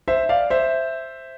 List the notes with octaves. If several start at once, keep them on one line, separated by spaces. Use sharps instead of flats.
C5 E5
D5 F5
C5 E5